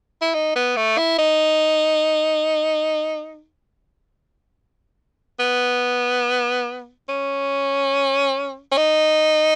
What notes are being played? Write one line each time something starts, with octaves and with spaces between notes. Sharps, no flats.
E4
D#4
B3
A3
E4
D#4
B3
C#4
C#4
D#4